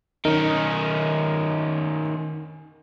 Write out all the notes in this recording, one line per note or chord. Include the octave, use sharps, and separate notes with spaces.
D#3 C#4 D#4 A#4 D#5